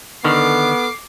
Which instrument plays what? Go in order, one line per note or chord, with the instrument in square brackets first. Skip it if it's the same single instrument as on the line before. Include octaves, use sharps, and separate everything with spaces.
[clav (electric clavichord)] D3 D#3 [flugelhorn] B3 [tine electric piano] A4 C#6 F6 [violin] D6 C7